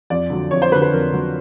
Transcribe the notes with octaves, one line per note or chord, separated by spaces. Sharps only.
F2 D5
D3 F#3
F2 C#5
C5
D3 F#3 B4
B4
F2 A#4
D3 F#3